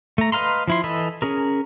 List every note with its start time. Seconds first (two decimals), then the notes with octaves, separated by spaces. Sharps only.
0.18 A3 A#5
0.32 B4 D#5 F5 A#5 C6
0.68 F3 E4 C6
0.84 E3 A4 D#5 B5
1.22 C#4 G#4 A#4